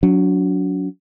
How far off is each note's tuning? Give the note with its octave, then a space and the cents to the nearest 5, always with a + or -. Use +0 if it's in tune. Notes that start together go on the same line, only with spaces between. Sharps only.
F#3 -10 D4 -40